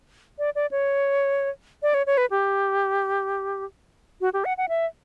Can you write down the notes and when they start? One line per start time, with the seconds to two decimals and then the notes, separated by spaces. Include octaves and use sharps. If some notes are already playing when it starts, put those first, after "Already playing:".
0.39 D5
0.55 D5
0.71 C#5
1.82 D5
1.94 C#5
2.07 C#5
2.17 B4
2.31 G4
4.21 F#4
4.34 G4
4.45 F#5
4.58 F#5
4.69 E5